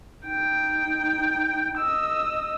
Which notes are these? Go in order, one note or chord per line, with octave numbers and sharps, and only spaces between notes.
D#4 G5
D#5 E6